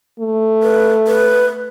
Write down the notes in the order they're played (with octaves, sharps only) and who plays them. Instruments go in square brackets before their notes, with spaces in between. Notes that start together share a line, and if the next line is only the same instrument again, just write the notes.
[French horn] A3
[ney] B4
B4